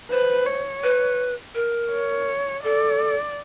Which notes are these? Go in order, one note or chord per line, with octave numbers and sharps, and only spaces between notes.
B4 C5
C#5
B4
A#4
C#5
A4 D5